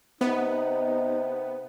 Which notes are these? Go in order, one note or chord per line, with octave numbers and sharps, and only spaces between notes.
C3 B3 D#4